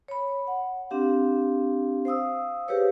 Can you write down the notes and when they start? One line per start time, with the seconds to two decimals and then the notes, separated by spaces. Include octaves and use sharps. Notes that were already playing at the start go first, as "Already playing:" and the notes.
0.08 C#5 B5
0.47 F#5
0.91 C4 D4 G4 F5
2.05 C5 F5 D#6 E6
2.68 G4 G#4 B4 C#5 F5